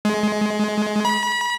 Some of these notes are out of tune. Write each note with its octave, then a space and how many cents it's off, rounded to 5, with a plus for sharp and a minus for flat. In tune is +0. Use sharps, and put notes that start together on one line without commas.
G#3 +20
B5 -35